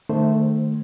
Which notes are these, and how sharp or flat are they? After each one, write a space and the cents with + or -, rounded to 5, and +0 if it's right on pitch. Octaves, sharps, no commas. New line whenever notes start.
D#3 -30 A3 +0 C5 +0